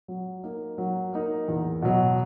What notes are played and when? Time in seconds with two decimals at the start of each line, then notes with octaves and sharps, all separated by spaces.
0.08 F#3
0.43 A#3 D#4
0.78 F#3
1.13 A#3 D#4
1.48 E2
1.82 B2 F#3